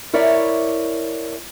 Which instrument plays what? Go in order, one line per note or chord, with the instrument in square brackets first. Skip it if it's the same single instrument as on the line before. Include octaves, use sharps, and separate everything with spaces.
[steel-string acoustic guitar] E4 A#4 C#5 D5 E5